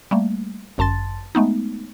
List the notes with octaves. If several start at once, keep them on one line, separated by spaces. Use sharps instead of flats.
G3 A3 A#3
G1 F#2 A5 C6 A6
G#3 A3 B3 D#4